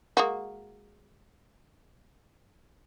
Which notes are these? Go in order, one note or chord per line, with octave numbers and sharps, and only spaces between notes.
G#3 A#3 F#4